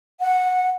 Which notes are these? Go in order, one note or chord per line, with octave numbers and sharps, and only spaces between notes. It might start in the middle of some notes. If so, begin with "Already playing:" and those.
F#5